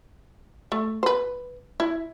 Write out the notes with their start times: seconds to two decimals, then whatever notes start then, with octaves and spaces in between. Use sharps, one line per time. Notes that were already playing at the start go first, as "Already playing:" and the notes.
0.72 A3
1.03 B4 C5
1.80 E4